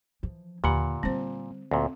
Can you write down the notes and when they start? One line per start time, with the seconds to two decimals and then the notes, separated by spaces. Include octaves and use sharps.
0.23 E3 F3
0.64 D#2 A#2 D3 G4 F#5 B5
1.03 G3 C4 F4 C5
1.71 D2 A#2 C4